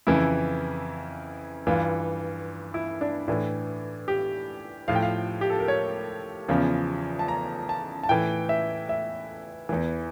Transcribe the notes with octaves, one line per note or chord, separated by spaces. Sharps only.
F2 C#3 E3 E4
G2 E3 F4
E4
D4
A2 E3 D4
G4
A2 F3 F5
G5
F5
G4
A4
A#4
C#5
E2 C#3 F3
A5
A#5
A5
A5
A2 E3 G5
E5
E5
E2 E3